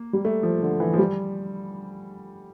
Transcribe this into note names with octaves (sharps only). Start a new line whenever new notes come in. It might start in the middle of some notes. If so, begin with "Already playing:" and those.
Already playing: A#3
G3
A3
F3
D3
E3
F3
G3